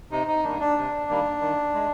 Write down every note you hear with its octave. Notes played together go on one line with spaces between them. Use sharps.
C3 D#4
D#4
D#3 G3 A#3 D4
D4
C3
D#3 G3 A#3
D#3
G#3